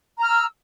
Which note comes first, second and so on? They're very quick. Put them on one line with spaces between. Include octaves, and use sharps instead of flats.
A#5 F6 E6